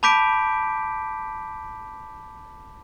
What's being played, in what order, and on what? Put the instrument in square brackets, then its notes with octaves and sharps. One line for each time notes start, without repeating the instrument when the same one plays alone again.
[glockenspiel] A5 B5 D6 G6 B6 D7